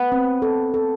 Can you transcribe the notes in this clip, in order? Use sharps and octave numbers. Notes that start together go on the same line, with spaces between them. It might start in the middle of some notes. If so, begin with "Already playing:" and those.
Already playing: B3
C4
A4
A4